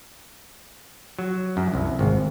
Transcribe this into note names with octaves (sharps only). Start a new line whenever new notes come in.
F#3
F#2
C2
G#1